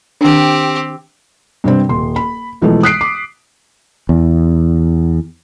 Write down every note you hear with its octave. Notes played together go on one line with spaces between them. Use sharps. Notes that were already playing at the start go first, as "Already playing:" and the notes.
D#3 C4 D4 G4
G2 C3 G3 C4
D#1 C6
B5
B1 E3 F3 G#3 A3
D#6 F#6 B6 C7 D7
D6
E2